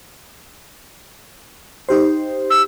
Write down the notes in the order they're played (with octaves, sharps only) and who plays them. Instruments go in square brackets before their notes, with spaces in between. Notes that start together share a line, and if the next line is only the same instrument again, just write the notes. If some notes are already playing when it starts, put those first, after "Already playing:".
[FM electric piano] D#4 G4 C5
[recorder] E6